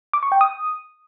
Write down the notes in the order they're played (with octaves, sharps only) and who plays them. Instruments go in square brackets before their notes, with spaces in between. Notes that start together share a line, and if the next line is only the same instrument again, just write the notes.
[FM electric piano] D6
C#6
G5
D#6